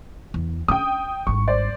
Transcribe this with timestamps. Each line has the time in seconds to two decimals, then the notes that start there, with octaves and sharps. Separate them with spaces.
0.34 E2
0.68 C#4 G5 D#6
1.27 G#1 G2 C#6
1.48 C5 D5